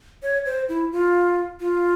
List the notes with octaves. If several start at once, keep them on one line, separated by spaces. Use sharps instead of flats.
C#5
C5
E4
F4
F4